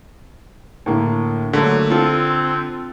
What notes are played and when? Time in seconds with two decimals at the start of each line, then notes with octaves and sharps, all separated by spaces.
0.86 A2 D3 A#3
1.53 D3 F#3 A3 A#3
1.90 C4 F4 A4